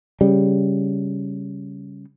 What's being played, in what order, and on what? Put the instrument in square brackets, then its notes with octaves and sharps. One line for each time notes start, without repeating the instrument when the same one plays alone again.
[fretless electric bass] C#3 G3